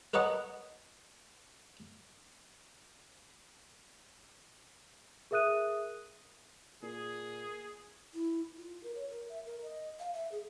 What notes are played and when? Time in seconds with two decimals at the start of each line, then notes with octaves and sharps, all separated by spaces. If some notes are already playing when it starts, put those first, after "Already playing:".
0.14 A#4 B4 C#5 D#5 F#5 A5
5.31 G#4 A#4 E5 D#6 F#6 D#7
6.83 A#2 G#4
8.14 E4
8.57 F4
8.83 A#4
8.95 C#5
9.09 A#4
9.28 E5
9.46 A#4
9.62 D#5
9.99 F5
10.13 E5
10.32 G#4